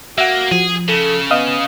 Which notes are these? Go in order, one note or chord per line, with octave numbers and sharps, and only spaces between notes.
A#3 F#4 E5 F#5
F3 G#4
C#3 A4
B3 D#5 F5 D#6